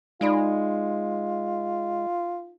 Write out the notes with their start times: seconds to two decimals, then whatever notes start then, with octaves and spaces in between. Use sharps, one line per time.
0.21 G#3 D#4 F4 D5 B5